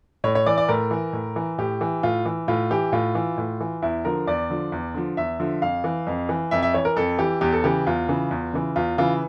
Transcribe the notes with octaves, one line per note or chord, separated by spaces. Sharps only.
A2 C#5
C#5
E3 D5
D5
A2 A#4
E3
A2
E3
A2 G4
E3
A2 F4
E3
A2 F4
E3 G4
A2 F4
E3
A2
E3
E2 E4
D3 F3 A#4
E2 D5
D3 F3
E2
D3 F3
E2 E5
D3 F3
F2 F5
E3
F2
E3
F2 E5
E5
E3 C#5
A#4
F2 A4
E3 G4
E2 G4
A4
C#3 E3 G4
E2 F4
C#3 E3
E2
C#3 E3
E2 F4
C#3 E3 F4